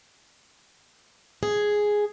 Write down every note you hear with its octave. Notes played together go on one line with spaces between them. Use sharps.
G#4